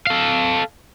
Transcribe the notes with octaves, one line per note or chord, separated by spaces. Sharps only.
A4 F5